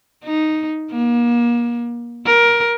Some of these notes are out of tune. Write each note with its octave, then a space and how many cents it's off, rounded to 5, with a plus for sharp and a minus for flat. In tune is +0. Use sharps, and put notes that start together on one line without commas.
D#4 +0
A#3 +35
A#4 +15